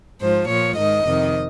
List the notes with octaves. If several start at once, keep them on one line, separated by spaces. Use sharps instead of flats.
G#2 F3 C5
A#2 F3 C#5
G#2 D#3 D#5
F2 C3 D#3